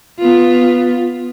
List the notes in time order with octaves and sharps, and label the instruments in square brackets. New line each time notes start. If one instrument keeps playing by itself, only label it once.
[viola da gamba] B3 F4